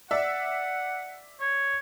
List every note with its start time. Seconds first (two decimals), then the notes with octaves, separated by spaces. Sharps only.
0.11 D5 E5 F#5
1.40 C#5